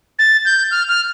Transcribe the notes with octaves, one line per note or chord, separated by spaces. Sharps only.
A6
G6
F6
F6